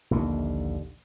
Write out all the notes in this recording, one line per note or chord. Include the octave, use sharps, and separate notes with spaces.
A#1 D#2 D3